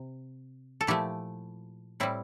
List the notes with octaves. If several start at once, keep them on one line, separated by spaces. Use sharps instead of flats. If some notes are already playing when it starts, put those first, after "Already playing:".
Already playing: C3
A4
A#2 F3 A3 E4 G4
A2 G3 C4 E4